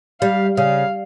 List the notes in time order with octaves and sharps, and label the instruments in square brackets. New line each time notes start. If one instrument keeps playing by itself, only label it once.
[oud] G3 [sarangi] F5
[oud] C#3 [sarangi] F5